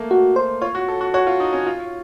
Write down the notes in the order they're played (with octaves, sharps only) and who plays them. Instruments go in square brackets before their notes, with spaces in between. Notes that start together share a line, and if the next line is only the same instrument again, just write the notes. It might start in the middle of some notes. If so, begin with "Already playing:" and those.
Already playing: [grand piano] A3 A#3
[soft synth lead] F#4
C5
[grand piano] F4 [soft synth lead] C#5
[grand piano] F#4
A4
F#4
[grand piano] F#4 [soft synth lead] C#5
[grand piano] F4
D#4
C#4
F4